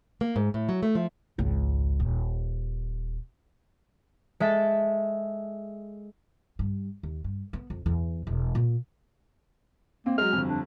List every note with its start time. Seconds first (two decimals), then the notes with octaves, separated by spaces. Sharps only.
0.21 A#3
0.36 G#2
0.54 A2
0.69 F#3
0.83 A3
0.95 F3
1.38 G#1 C#2
2.00 D#1
4.40 G#3 A4 E5 A6
6.59 G2
7.03 D#2
7.24 G2
7.53 B3
7.70 F2
7.86 E2
8.27 E1
8.55 A#2
10.06 A#3 C4
10.18 F#3 G#3 F6
10.33 G1 F2
10.48 D4